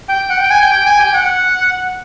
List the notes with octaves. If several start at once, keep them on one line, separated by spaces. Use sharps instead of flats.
G5
F#5
G5
G#5
G5
G5
G#5
G5
F#5